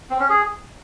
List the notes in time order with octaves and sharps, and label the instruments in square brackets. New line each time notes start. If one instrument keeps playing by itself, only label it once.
[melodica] C4
C#4
G#4